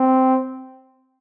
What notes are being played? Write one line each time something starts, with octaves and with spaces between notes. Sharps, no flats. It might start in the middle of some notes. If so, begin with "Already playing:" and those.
Already playing: C4